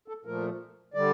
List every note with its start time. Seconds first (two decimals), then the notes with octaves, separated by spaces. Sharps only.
0.08 A4
0.25 A#2 F3 A3 A#4
0.94 D3 G3 D5